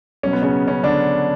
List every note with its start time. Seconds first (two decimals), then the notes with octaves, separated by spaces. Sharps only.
0.23 B2 F#3 C#4
0.33 B3
0.43 C#3 C#4
0.68 C#3 C#4
0.83 D3 D4